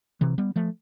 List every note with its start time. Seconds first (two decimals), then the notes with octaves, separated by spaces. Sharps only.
0.21 C3 E3
0.38 G3 B3
0.56 F3 A3